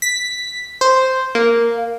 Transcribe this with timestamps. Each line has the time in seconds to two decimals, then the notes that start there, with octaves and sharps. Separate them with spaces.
0.02 B6
0.81 C5
1.35 A#3